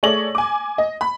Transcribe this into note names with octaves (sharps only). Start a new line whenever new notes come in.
A3 G#4 C#5 D5 A#6 F#7
G#5 D6
D#5
B5